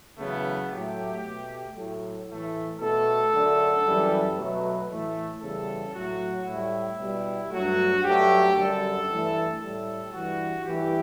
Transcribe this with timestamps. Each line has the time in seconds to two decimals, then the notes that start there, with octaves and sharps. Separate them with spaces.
0.18 E2 C#3 F#3 A3 B3
0.71 A2 F#3 A3 G4
1.24 B2 A3
1.75 A2 F#3 A3 A4
2.28 A2 E3 A3
2.80 B2 A3 A4
3.33 F#2 D3 A3
3.85 F#2 E3 G3
4.37 B2 F#3 A3 B4
4.90 A2 E3 A3
5.41 E2 C#3 G3 A4
5.95 A2 F#3 A3 F#4
6.46 A2 G3 E4
6.99 B2 G3
7.51 G2 F#3 A3 F#4
8.04 G2 F#3 A3 G4
8.56 F#2 D3 G3 A4
9.08 G2 E3 A3
9.60 A2 G3 A4
10.13 G2 E3 G3 F#4
10.65 G2 E3 A3 G4